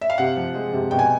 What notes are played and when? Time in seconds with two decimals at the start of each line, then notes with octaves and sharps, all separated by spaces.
0.01 E5
0.10 F5
0.18 C3 F#5
0.37 F3
0.55 G#3
0.73 C3
0.91 B2 G5
0.99 G#5